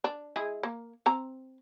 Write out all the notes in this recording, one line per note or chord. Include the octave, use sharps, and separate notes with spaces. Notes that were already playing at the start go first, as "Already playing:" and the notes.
D4
G#3 E4 G#4
A#3
C4 A#5